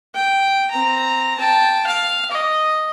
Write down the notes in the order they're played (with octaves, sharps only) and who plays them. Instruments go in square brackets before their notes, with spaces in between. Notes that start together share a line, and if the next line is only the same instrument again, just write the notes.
[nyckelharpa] G5
C4 A#5
G5 A5
F5
D#5